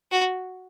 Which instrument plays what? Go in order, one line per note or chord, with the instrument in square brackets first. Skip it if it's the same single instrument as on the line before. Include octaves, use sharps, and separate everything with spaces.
[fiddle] F#4